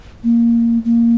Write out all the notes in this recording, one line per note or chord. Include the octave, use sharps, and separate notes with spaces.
A#3
A#3